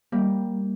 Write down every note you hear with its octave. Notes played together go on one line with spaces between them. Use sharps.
G3 A#3